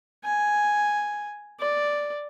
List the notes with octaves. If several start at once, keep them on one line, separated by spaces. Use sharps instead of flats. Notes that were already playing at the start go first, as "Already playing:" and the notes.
G#5
D5